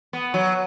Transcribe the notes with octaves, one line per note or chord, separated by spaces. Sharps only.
B3
F#3